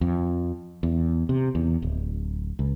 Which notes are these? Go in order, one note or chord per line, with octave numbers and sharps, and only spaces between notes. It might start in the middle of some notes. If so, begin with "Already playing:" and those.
F2
E2
C3
E2
D1
C#2